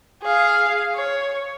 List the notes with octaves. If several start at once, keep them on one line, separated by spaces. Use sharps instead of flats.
G#4 F5
C#5